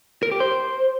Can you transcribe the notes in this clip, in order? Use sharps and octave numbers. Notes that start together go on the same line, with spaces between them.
A#4
G4
C5